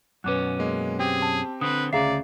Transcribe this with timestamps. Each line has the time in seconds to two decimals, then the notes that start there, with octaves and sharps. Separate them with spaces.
0.24 F#2 B2 C#4 B4 D6 F#6
0.59 G#3 A#3
0.99 C4 G4 G#4 G5
1.22 A5
1.61 D3 C4 B4 D#6
1.93 D2 C#3 G#4 D5 E5 F5 A#5 C7